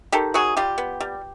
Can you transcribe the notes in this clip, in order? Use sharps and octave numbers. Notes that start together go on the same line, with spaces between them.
D#3 G4 A4
F#3 F#4 G#4
G3 F4 G4
B3
G3